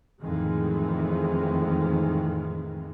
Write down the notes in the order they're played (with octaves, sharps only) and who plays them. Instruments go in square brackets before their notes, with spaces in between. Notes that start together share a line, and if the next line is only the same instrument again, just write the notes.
[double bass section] F2 A2 D#3 E3 G#3